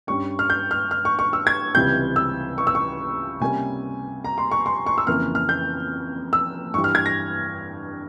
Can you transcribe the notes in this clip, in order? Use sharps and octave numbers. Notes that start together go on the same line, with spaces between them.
G2 G3 C#4 C#6
F6
G6
F6
F6
C#6
C#6
E6
G#6
C#2 C3 E3 G3 C4 G6
E6
C#6
E6
C#6
C3 G3 A#3 C#4 G#5
A#5
C6
C#6
C6
C#6
E6
F2 C#3 E3 A#3 F6
F6
G6
E6
G2 E3 G3 C#6
F6
G#6
A#6